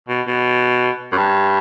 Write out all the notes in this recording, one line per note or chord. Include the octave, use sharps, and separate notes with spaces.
B2
B2
F#2
G2